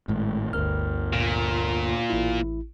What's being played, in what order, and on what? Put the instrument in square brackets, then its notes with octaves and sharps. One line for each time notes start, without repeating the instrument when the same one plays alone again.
[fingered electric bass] G#1 A2 [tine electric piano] G#3
[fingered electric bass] D1 G1 [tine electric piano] D2 A#4 F6
[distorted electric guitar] A#2
[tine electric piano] A1 E4